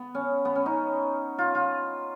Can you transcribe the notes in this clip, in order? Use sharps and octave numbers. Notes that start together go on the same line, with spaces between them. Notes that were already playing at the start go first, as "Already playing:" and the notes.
Already playing: B3
C#4
B3
C#4
D#4
F4
F4